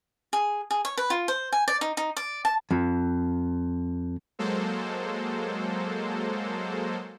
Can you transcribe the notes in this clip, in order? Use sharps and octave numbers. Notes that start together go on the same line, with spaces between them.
G#4
G#4
C#5
B4
F4
C5
G#5
D5
D#4
D#4
D5
A5
F2
F#3 G#3 A#3 A4 C5